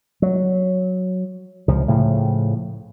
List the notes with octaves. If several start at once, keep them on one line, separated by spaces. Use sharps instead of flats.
F#3
C#2 C3 F3
A2 C#3 F3